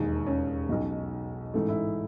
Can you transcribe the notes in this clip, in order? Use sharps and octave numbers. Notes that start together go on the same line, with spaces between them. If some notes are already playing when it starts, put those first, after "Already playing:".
Already playing: E1 D#2 D#3 G#4
C#4
B1 B2
A1 G#2 E3 A3
E4